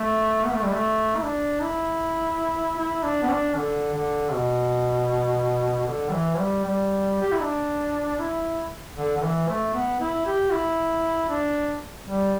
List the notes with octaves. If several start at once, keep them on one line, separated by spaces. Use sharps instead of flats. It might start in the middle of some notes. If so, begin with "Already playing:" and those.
Already playing: A3
B3
A3
G3
A3
E4
D4
E4
E4
D4
B3
D4
D3
D3
B2
D3
G3
E3
G3
G3
G4
E4
D4
E4
D3
D3
E3
A3
B3
E4
G4
E4
D4
G3